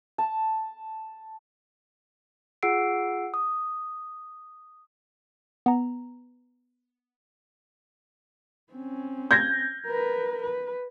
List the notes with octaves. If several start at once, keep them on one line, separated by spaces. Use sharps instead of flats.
A5
F4 G#4 F#5 E6 C7 D7
D#6
B3 A#5
C4 C#4
G6 G#6 A#6
A#4 B4
B4